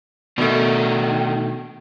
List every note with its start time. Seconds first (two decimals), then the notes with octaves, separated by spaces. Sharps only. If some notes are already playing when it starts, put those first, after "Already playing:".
0.38 B2 D#3 A3 D4